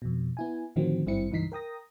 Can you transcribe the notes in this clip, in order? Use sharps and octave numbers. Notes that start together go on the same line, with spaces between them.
F2 B2
B3 E4 G#5
A2 D3 D#3 F3 F#3 C4
G#1 G2 G3 C4 E4 C#7
C#2 G2 E3 D#4 B6 C7
A#4 G5 D#6 A#6